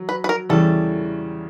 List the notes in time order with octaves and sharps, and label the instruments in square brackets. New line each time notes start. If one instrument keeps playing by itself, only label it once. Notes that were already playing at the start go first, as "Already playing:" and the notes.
Already playing: [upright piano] F#3
[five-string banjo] B4
B4
A#4
[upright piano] E2 C#3 E3 G3 [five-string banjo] A4